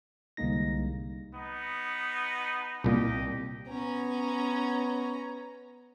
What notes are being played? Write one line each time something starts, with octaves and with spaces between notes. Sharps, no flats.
C2 D3 G#3 A#3 D#4 A#6
B3 D#4
C2 A#2 G4 D#5
B3 C#4 A#5